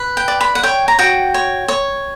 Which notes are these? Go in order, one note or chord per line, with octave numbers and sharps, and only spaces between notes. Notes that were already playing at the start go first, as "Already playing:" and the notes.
Already playing: B4
G5
D5
B5
F#5
C#5 G5
A#5
F#4 G5
C#5
C#5